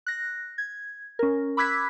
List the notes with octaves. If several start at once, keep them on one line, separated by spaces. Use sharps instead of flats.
F#6 A#6
G#6
C#4 A#4
B5 D6 E6 F#6 G#6 B6